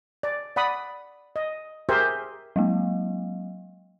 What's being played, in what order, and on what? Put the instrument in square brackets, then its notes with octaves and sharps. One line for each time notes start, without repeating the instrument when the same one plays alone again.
[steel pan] D5
D5 F#5 B5 D#6
D#5
G4 G#4 A#4 C5 E5 G#5
[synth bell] F#3 G#3 A#3